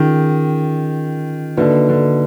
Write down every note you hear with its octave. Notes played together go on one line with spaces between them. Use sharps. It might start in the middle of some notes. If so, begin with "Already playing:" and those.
Already playing: D#3 C#4 F4 G#4
D3 A#3 D#4 F#4 B4 E5
D3